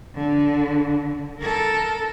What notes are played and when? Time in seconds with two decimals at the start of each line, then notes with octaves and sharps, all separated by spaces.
0.15 D3
1.40 A4 A#4